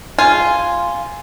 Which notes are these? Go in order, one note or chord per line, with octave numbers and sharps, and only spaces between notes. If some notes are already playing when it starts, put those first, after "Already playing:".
F4 G#5